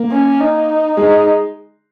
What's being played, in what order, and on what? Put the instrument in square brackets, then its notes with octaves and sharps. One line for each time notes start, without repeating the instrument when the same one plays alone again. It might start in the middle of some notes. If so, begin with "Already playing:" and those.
Already playing: [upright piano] A#3
[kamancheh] C#4
D#4
[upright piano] G#3 [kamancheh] D#4